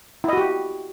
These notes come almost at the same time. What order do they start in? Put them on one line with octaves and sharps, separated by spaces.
E4 D#5 F#4 G4